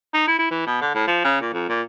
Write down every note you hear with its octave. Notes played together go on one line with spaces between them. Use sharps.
D#4
E4
E4
E3
B2
D3
A2
F3
C#3
A#2
F2
A#2